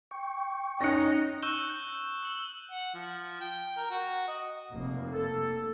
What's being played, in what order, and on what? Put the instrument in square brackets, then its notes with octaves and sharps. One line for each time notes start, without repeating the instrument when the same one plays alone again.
[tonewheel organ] G5 C#6
[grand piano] C#4 C#7 [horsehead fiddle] D#4 [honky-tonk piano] F#6 A#6
[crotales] C#6 E6 F#6 G6 E7 G7
G6
E6 F#7 G7
[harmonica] F#5
F3
G5
A#4
F#4
D#5
[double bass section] F1 A#3
[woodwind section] A4